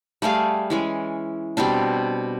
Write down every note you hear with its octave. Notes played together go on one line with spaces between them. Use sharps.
G3 A3 G#4 F5
E3 G#3 C#4
B2 G3 C4 D4